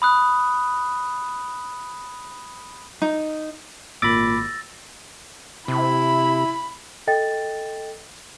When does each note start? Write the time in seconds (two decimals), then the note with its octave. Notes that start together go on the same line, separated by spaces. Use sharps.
0.02 B5 D#6 F#6
3.02 D#4
4.02 G#1 A#2 B5 D6 E6 A6 A#6
5.68 C3 E4 B5
7.07 A4 D#5 G5 A6